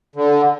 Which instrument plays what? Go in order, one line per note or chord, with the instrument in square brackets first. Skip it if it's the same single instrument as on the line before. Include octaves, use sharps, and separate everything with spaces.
[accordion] D3